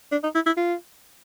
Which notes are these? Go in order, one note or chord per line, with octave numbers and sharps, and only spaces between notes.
D4
D#4
E4
E4
F4